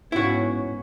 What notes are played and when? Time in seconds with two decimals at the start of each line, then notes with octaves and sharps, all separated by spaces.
0.12 G#2 B3 C#4 E4 F#4